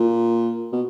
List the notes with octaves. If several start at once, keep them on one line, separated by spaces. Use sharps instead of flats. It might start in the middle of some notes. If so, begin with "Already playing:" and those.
Already playing: A#2
B2